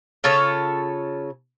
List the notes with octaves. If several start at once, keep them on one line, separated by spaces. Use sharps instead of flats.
C#3 F4 A4 C#5